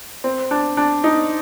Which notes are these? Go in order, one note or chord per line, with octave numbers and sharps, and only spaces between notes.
C4
D4
D4
D#4